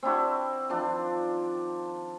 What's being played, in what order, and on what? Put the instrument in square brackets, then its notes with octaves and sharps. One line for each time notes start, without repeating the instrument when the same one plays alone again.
[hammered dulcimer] C4 D4 E4 F#4
D#3 F3 D4